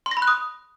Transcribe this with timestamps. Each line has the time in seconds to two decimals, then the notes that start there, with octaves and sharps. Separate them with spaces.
0.06 C6
0.11 A#6
0.17 B5
0.22 F#6
0.28 D#6